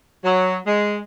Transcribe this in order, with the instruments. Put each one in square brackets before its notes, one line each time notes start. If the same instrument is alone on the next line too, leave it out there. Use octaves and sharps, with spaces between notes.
[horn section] F#3
G#3